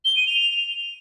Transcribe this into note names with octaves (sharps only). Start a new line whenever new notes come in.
G7
D#7
F7